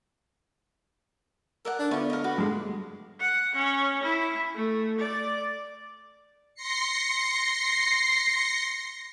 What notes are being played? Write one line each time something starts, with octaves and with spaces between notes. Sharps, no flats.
A4 A#4 D5 F#5
D4
D3 B3 E4 F4 C#6
A#4 D#5
F#4 B4 D6
G2 G#3
F#5
C#4
E4
A3
D5
C6 A#6 C7 C#7